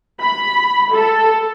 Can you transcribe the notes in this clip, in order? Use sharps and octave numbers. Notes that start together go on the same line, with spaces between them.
B5
A4